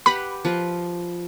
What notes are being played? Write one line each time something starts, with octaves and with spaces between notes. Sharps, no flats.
G4 B4 F#5 B5
F3 F4 B4